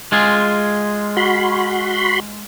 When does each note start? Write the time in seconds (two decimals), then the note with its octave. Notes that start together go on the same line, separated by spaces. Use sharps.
0.12 G#3 F4 G#4
1.17 F#4 B5 C6